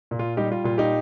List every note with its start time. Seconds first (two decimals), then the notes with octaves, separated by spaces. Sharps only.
0.11 A#2
0.19 F4
0.37 G3 D#4 G4
0.52 F4
0.64 A#2 F4
0.78 D#4 G4